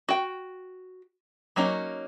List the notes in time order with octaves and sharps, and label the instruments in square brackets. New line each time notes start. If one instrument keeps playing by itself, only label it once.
[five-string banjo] F#4 G5
F#3 A#3 C#4 D#4